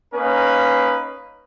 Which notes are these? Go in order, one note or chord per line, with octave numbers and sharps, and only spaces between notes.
A#3 C#4 D#4 B4